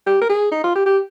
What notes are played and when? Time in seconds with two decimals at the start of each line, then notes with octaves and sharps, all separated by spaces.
0.07 G4
0.21 A#4
0.29 G#4
0.52 D#4
0.64 F4
0.75 G4
0.86 G4